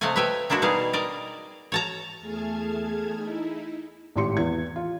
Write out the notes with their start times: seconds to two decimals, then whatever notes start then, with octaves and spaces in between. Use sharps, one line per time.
0.01 C3 A3 D#5 F5 F#5 G#5
0.16 B4 C#5 E5 G5 G#5
0.50 G#3 A#3 D4 E4 F#4
0.62 B2 G3 D#4 G#4 F5
0.93 A#4 D5 D#5
1.72 C#5 A5 A#5
2.20 E2 A3 G#4 A5 F6 G#6
3.16 D#4 E4
4.16 G#1 A2 G4 C6 C#7
4.37 E2 E3 G#6
4.76 F4